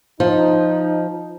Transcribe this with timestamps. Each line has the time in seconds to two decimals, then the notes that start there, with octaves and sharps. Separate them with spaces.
0.20 F3 D#4